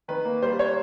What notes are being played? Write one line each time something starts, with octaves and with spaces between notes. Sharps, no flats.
D#3 B4
A#3
G3 C5
C#5